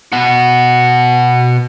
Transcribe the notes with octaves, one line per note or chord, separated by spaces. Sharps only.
B2 F#4